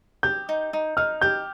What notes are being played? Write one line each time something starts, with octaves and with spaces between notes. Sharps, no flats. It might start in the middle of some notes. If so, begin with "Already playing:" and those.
G4 G6
D#4
D#4
D#4 F6
G4 G6